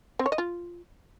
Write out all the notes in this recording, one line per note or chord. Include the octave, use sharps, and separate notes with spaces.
C4
C#5
D#5
F4